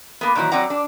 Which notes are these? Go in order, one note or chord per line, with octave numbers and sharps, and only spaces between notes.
A#3 B3
A#2 D#3 E3 F#3
F#3 C4 D5 F#5 A#5
D4